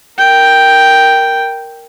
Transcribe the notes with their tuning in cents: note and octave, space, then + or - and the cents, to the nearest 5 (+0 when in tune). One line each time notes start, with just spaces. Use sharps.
A#4 +0 G5 +0